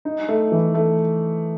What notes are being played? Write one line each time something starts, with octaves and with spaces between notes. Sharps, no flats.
D#4
A3
E3
A3